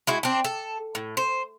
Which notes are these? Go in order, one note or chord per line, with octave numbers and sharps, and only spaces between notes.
G#3 E4 F#4
C4 D4
A4
A2
C5